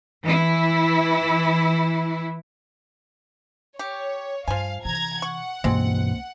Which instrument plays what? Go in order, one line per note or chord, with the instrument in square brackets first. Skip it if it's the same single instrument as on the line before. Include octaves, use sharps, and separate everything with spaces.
[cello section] E3 E4
[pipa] G4 [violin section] C#5
[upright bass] G2 [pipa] F3 G#5 [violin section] F5
[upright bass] C3 E3 [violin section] A#5 G#6
[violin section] F#5 [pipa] C#6
[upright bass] C#2 A#3 [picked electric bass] G2 B2 E3 [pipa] G#3 C4